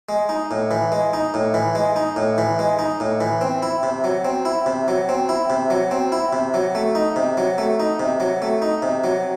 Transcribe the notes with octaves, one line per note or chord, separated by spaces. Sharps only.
G#3
D#4
A2
E3
G#3
D#4
A2
E3
G#3
D#4
A2
E3
G#3
D#4
A2
E3
C4
E4
C3
F#3
C4
E4
C3
F#3
C4
E4
C3
F#3
C4
E4
C3
F#3
A3
D#4
C3
F#3
A3
D#4
C3
F#3
A3
D#4
C3
F#3